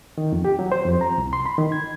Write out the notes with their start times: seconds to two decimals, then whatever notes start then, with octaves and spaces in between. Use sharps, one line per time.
0.18 D#3
0.33 F2
0.45 G4
0.59 F#3
0.72 C5
0.85 F2
1.01 A#5
1.18 C2
1.33 C6
1.46 B5
1.58 D#3
1.72 G#6